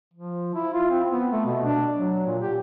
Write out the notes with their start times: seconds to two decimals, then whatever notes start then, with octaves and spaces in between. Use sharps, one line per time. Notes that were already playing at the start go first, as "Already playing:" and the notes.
0.14 F3
0.55 E4
0.74 F4
0.90 C4
1.11 B3
1.32 A3
1.46 B2
1.64 D4
1.97 F#3
2.26 A#2
2.41 G4